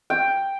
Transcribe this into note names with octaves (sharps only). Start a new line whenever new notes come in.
G5